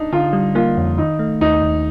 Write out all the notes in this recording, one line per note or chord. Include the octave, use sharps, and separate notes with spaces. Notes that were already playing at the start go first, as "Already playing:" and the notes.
Already playing: D4 D#4
D3 F4
G3
A#3 F4
F2
D#3 D#4
A3
D#2 D#4
D#2